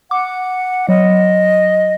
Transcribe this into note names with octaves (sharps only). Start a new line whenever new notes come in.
F#5 D6
F#3 D#5